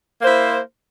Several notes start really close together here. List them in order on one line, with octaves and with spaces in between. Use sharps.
A#3 C5 E4